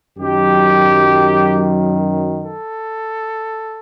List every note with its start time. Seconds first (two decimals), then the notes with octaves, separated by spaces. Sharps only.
0.18 F#2 D#3 F#3 G4
2.42 A4